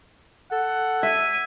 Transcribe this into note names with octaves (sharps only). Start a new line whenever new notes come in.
A4 F#5
E5 G#6 D#7